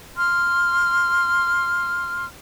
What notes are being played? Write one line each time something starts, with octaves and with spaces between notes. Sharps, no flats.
C6 F6